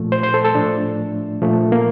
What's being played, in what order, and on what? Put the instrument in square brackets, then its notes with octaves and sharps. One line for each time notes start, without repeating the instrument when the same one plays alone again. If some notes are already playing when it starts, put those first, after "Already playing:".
Already playing: [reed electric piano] A#2 F3 A3
C5
C5
A4
A4
A2 F3 A3 D4
A#2 F3 A3
A#3